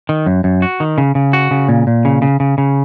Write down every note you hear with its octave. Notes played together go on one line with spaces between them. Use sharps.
D#3
F#2
F#2
F#4
D#3
C#3
C#3
F#4
C#3
A#2
A#2
C#3
C#3
C#3
C#3